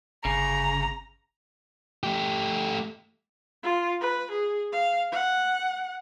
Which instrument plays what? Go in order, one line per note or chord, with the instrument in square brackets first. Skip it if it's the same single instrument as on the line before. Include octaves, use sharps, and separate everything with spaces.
[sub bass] G1 [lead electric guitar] C#3 [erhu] A#5
[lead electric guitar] A3 G4
[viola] F4
B4
G#4
F5
F#5